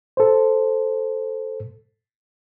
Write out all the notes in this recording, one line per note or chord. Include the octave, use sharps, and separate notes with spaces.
A4 C5